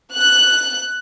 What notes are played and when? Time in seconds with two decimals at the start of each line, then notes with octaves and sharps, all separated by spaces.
0.14 F#6